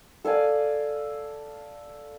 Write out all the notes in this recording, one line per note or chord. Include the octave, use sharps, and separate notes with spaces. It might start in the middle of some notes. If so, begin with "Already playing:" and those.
A4 D5 F5 G#5